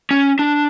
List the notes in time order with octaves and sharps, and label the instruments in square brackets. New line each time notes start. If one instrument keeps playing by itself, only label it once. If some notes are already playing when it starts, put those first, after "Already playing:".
[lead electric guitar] C#4
D4